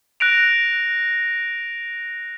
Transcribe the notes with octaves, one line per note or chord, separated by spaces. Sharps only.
F#6 A#6 D7 F7